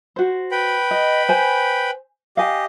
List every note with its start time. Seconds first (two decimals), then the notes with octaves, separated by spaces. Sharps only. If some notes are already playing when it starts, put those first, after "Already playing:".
0.16 F#4 C5
0.51 B4 G5 B5
0.91 D#5
1.29 C5 G#5
2.37 G4 D#5 F5 G#5